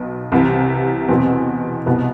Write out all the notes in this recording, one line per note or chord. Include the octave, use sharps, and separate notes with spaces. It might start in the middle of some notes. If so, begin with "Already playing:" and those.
Already playing: B1 B2
C2 C3 E3
E2 B2 C4
C2 B2 B3